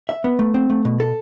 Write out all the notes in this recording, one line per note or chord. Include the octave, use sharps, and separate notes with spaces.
E5
B3
A3
C4
A3
B2
A4